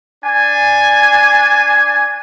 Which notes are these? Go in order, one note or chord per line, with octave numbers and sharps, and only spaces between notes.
D4 G#5